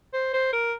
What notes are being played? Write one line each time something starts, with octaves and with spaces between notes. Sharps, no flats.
C5
C5
A#4